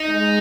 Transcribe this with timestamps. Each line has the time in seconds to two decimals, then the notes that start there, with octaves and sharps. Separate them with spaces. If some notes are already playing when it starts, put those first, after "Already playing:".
Already playing: D#4
0.09 G#3